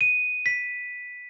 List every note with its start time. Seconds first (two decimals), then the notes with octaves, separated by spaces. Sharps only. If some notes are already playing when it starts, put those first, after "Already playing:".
0.01 D#7
0.46 B6